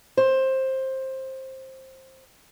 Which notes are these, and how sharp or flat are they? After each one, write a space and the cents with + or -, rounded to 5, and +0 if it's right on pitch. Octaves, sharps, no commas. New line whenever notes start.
C5 +15